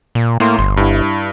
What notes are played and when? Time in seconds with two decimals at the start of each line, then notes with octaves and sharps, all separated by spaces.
0.15 A#2
0.40 A2 A#3 C6
0.59 G1 C6
0.77 G2 E4